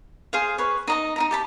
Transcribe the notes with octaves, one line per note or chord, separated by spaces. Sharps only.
G#4 C5 F5
B4 C#5
D#4 D#5 A#5
D#4 E4 A#5
G4 A5 B5